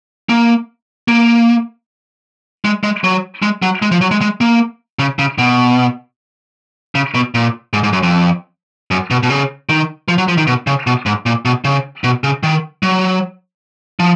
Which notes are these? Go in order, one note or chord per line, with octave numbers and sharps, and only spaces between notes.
A#3
A#3
G#3
G#3
F#3
G#3
F#3
G#3
F3
F#3
G#3
G#3
A#3
C#3
C#3
B2
C#3
B2
A#2
G#2
G#2
F#2
F2
F#2
B2
B2
C#3
D#3
F3
F#3
F3
D#3
B2
C#3
B2
G#2
A#2
B2
C#3
B2
C#3
D#3
F#3
F3